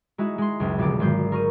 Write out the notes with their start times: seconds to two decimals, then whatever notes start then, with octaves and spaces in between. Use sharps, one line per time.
0.18 G#3 D#4 E4 F#4
0.38 G#3 C6
0.60 F#1 C#2
0.78 F1 B1 D3 D5 D6
1.00 G#1 F#3 G6 C7
1.32 A#4 C#6 D#7